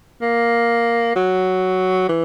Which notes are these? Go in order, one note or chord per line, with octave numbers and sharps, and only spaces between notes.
A#3
F#3
E3